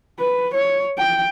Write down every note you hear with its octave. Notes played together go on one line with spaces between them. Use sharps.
B4
C#5
G5